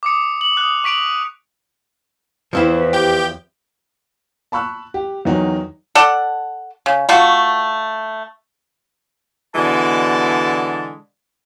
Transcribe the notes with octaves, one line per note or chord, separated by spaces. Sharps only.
D6 D#6 C#7
F#7
D#6 F#6
C#6 B6 D7 F7 F#7
E2 F3 C4 E4 B4
G4 G6
A5 B5 C#6 E6 F#6
G4
E2 D#3 F#3 D#4
A4 D5 F#5
C#3
A3 F4 F#4
B2 D3 E3 G#3 D5 A5